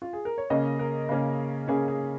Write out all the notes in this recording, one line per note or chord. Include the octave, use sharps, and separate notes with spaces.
F4
G#4
A#4
C#5
C#3 A#3 C#4 D#5
A#4
C#3 A#3 C#4
C#3 A#3 C#4 G#4
G#4